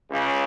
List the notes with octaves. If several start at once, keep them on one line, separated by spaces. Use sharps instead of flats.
C#2 C#3